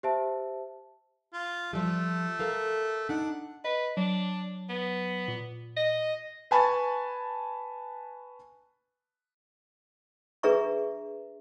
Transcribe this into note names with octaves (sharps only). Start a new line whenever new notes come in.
G4 C5 E5 A5
F4
F3 G3 A3
A4 A#4 F5
D4 D#4 F#5
B4 D#5
F#3 D4
B3
A#2
D#5
B4 G#5 A5 B5 C#6 A6
D4 G#4 B4 E5 A#5 C#6